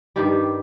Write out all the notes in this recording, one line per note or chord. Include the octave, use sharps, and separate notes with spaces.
G2 D#3 G3 G4